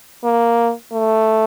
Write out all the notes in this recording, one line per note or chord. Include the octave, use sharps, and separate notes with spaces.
A#3
A3